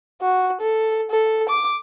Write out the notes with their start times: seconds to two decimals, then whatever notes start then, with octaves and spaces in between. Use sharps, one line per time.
0.22 F#4
0.61 A4
1.10 A4
1.49 D6